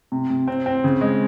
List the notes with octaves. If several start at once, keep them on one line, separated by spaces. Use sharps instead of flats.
C3
C3
C4
C4
C#3
G#3